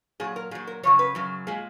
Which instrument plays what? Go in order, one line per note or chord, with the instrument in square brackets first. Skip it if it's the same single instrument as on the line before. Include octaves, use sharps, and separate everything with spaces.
[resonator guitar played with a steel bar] A#2 F#3 G#4
A#4
A#2 G#4
F#3
A#4
F#2 C#3 F#3 C#5
B4
F#2 C#3 F#3
A#2 G#3 G#4